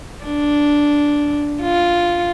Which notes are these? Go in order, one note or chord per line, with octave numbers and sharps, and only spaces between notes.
D4
F4